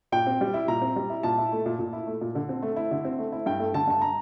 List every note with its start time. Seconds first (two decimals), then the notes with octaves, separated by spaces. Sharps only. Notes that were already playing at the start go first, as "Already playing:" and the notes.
0.12 A#2 G5
0.26 C4
0.41 G3
0.54 E4
0.68 A#2 A#5
0.81 C4
0.96 G3
1.10 E4
1.23 A#2 A5
1.38 E4
1.52 A3
1.66 A#2
1.79 A#2
1.93 E4
2.07 A3
2.21 A#2
2.35 D3
2.49 C4
2.62 A3
2.76 E4
2.91 D3
3.05 C4
3.19 A3
3.32 E4
3.46 G2 G5
3.60 A3
3.74 D3 A5
3.87 G2 A5
4.02 A#5